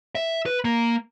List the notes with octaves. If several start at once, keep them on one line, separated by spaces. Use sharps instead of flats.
E5
B4
A#3